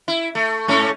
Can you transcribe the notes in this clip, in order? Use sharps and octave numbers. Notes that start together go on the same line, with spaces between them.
E4
A3
G#2 A3 C#4